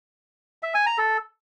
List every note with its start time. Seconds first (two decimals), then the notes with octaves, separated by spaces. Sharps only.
0.63 E5
0.74 G#5
0.86 A#5
0.98 A4